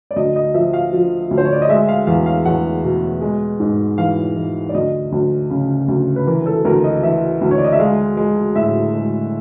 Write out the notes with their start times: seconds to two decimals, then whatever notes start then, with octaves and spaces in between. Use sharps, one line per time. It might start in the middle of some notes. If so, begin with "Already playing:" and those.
0.11 D5
0.16 D2 D#5
0.36 D#5
0.54 F3 E5
0.73 F5
0.93 F3
1.31 D2
1.37 C5
1.45 C#5
1.53 D5
1.62 D#5
1.69 G#3 E5
1.88 F5
2.07 E2 F5
2.26 F5
2.45 E2 F#5
2.84 B2
3.21 G#3
3.60 G#2
3.98 E3 F5
4.36 E3
4.69 D5
4.74 D2 D#5
5.12 D2
5.50 C#3
5.88 D2
6.16 B4
6.27 E3 A#4
6.46 A4
6.65 D2 A#4
6.84 D#5
7.03 E3 E5
7.41 D2
7.51 C#5
7.58 D5
7.64 D#5
7.72 E5
7.79 G#3 F5
8.17 G#3
8.55 A2 E5
8.94 G#3